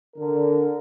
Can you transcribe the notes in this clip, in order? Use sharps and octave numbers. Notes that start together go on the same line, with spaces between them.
D3 A#4